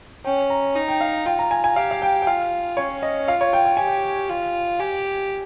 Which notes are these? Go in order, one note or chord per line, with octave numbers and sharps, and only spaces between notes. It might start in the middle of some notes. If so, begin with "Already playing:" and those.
C#4 G5
A#5
D#4
G5
F5
F4 G5
A#5
G#5
G#5
G4 F5
F5
G5
G5
F4 F5
C#4 C#5
D#5
F4 F5
C#5
G5
G5
G4 G#5
G5
F4
G4 G#5